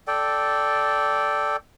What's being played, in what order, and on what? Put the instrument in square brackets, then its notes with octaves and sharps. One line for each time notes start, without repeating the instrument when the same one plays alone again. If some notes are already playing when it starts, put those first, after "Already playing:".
[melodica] A4 D5 G5